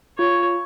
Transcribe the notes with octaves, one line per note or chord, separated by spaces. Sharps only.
F4 C#5